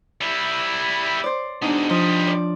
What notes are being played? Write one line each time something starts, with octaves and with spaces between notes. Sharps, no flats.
G3 E4
C5 D5
B2 G#3 D4 D#4
F3 G3 D#5
D5